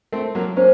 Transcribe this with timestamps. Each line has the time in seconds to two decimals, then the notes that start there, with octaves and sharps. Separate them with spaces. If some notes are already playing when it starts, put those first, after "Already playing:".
0.12 A3 C4 A#4
0.35 F#3 A#3
0.57 A#3 C#4 C5